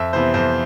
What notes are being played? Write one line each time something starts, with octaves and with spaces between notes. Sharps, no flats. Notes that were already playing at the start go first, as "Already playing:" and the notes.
Already playing: F2 E5
C3 E3 B3 C5
F2 C5